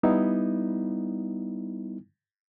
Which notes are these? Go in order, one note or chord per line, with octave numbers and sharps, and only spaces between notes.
G3 B3 D#4 E4